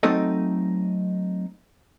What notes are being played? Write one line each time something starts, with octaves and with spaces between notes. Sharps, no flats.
F#3 A3 C4 D#4 A4 D#5